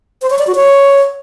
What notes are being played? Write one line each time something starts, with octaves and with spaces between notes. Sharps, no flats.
C5
C#5
D5
F#4
C#5